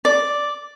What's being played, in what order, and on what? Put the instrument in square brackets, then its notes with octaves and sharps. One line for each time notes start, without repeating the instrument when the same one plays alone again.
[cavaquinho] D5